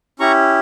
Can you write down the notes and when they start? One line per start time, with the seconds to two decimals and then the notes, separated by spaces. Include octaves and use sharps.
0.19 C#4 E4 G4 A#5 C#6